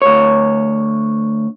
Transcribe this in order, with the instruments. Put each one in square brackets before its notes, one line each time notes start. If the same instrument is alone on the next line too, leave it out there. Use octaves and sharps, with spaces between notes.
[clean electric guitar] D2 C#5